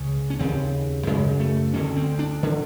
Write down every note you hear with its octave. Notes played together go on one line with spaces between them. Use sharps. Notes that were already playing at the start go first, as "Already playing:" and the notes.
Already playing: C#2 C#3
C#4
D#2 C#3 C4
F#2 C#3 G#3
A3
D2 D3 C#4
C4
D4
D3